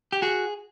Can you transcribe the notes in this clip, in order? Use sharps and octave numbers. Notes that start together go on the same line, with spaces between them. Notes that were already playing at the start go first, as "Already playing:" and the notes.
G4
F#4 G#4